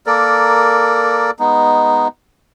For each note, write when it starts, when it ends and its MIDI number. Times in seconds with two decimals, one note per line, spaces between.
0.06 1.31 58
0.06 1.31 69
0.06 1.31 70
0.06 1.31 74
1.39 2.08 56
1.39 2.08 59
1.39 2.08 63